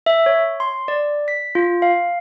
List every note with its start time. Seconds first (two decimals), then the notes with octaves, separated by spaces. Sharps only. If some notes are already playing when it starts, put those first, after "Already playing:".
0.06 E5
0.26 C#5
0.60 C6
0.88 D5
1.28 B6
1.55 F4
1.82 F5